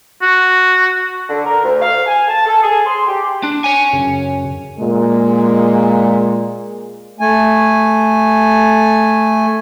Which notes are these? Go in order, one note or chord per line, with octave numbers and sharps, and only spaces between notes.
F#4
D3
A#4
D2
F5
G#5
A5
A4
G#4
C6
G4
D4
C#5 G#5
F#2 C#3
A#2 G#3
A3 G#5